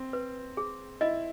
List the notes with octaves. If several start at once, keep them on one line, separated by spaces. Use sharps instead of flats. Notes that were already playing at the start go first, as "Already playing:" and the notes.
Already playing: C4
B4
G#4
E4 D#5